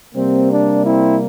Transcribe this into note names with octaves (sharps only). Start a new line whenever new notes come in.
C3 G3 A#3 C4
D4
C4 E4